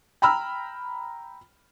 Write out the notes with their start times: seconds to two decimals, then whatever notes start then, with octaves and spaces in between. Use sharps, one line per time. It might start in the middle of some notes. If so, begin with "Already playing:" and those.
0.22 G5 A#5 B5 E6 F6